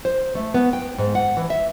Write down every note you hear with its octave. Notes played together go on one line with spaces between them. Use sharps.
C5
A3
B3
G5
G#2
F#5
E3
E5